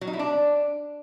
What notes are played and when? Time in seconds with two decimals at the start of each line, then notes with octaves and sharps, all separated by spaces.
0.01 F#3
0.07 D#4
0.13 E4
0.19 D4